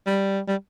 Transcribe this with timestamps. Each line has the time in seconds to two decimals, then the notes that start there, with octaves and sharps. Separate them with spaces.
0.06 G3
0.48 G3